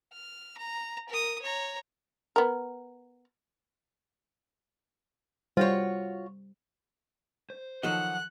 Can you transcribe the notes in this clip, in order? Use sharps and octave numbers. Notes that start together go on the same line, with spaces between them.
F6
A#5
A#4 D#6
C#5 A#5
B3 A#4
G3 F4 F#4 C5 C#5
C5
D#3 F3 F#3 A4 D#5 F#5 F#6